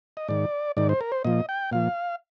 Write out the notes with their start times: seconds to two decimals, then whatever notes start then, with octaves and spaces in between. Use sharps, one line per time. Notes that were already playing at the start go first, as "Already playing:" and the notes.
0.17 D#5
0.28 G#2 D#3 D5
0.77 G#2 D#3 D5
0.89 C5
1.01 A#4
1.12 C5
1.24 A#2 F3 D#5
1.49 G5
1.72 A#2 F3 F5